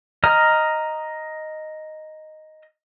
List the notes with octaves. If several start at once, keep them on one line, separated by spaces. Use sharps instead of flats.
D#5 A#5 D#6 F6